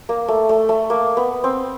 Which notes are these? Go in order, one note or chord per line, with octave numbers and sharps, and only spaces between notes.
A#3
A3
A3
A3
A#3
B3
C4